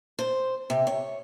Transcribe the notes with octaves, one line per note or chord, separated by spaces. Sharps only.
C5
C3
C#5